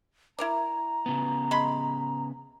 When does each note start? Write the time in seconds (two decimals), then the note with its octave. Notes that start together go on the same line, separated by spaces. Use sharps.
0.39 E4 A#4 D5 A#5
1.06 C#3 B3
1.51 G#3 B5 C6